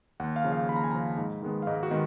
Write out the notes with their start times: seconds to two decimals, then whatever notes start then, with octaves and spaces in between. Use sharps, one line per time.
0.20 D#2 F#5
0.36 F5
0.44 C#3 F3
0.53 F5
0.69 D#2 B5
0.76 A#5
0.84 G#5
0.91 C#3 F3 A#5
1.17 G#2
1.42 D#3 G#3 B3
1.62 F5
1.67 G#2 D#5
1.83 F#4
1.91 D#3 G#3 B3